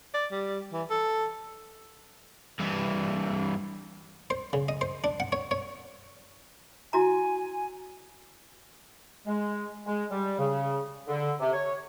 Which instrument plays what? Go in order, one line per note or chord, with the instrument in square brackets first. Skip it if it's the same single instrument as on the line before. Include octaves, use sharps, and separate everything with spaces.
[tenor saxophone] D5
G3
E3
A4
[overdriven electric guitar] G2 E3
[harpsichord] C5
C#3
D#5
C5
D4
F#5
C#5
C#5
[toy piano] E4 F#4 A#5 [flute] G#5
[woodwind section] G#3
G#3
G3
C#3
D3
C3
C#5